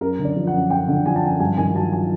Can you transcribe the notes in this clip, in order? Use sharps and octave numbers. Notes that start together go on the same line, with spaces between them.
F#2 A#4
D3
D5
F3
F#5
F#2
F#2 G5
D3
F3 G#5
A5
F#2 G#5
G2 G#5
D#3 G#5
F#3 A5
G#5